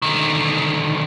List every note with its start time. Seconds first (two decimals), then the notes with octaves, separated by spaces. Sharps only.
0.02 D3 D#3